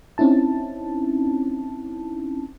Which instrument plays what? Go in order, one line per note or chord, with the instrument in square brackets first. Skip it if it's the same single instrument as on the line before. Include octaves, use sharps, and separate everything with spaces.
[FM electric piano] C4 C#4 D#4 E4 A5